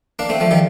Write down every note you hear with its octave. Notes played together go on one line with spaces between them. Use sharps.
A#3 D4
A3 C4
F3 A3
D#3 G3